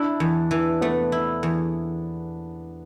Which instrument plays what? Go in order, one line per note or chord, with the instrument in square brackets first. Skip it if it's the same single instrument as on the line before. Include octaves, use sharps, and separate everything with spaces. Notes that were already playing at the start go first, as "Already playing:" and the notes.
Already playing: [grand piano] D4 [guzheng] E4
[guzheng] E2
E3
[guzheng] A3 [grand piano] B3
[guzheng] E4
E2